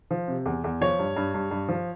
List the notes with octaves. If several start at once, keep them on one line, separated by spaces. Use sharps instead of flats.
F3
C3
E2
E2
F3 C#5
G2
G2
G2
G2
F3